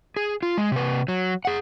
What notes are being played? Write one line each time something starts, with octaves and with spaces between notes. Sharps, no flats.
G#4
F4
G#3
C3 B4
F#3
G#4 F#5